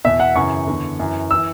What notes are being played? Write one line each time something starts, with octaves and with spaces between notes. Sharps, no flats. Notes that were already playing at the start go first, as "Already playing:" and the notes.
E2 B2 E5
F#5
F#2 C#3 E3 C#6
E2 D3
F#2 E3
E3 E6